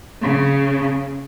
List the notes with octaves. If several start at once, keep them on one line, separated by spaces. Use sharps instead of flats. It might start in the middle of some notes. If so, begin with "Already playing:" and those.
C#3